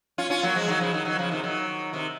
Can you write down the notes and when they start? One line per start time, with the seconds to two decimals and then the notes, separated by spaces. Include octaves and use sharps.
0.18 C#4 F4
0.30 C#4 F4
0.43 F#3 A#3
0.55 F3 G#3
0.68 D#3 F#3
0.80 C#3 F3
0.93 D#3 F#3
1.05 D#3 F#3
1.18 C#3 F3
1.31 C3 D#3
1.43 D#3 F#3
1.93 C3 D#3